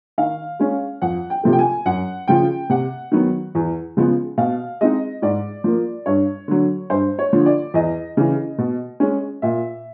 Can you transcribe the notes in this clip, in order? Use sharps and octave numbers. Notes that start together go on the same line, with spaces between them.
D#3 F5
G#3 C#4
F2 F#5
G5
C3 F3 A3
G5
G#5
F#2 F#5
C#3 F3 G5
C3 F#5
D#3 F#3 B3
E2
C#3 F3 G#3 B3
B2 F5
G#3 C4 D#4 D#5
G#2 D5
F3 A#3
G2 C#5
D3 F#3
G2 C5
C#5
D3 F3
D5
E2 D#5
C#3 E3
B2
G#3 C#4
A#2 E5